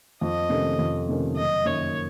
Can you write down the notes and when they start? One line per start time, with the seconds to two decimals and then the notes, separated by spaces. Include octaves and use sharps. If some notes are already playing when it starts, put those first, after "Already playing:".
0.21 F2 D#5
0.50 C3 D#3 A3 C#4
0.79 F2
1.08 C3 D#3 A3 C#4
1.36 F#1 D#5
1.65 F#2 D#3 A#3 D#4 C#5